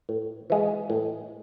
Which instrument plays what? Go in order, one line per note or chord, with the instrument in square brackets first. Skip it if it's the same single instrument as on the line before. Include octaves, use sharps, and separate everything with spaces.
[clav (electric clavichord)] A2
E3 G#3
A2